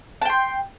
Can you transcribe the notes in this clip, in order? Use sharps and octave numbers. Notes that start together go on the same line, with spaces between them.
G5 A5 C6